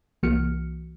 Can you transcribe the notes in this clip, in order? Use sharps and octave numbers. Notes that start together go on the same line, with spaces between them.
C2 E3 A#3 F#4 F6 C#7